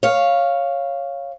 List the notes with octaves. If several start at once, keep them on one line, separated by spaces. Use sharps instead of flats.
C#5 F5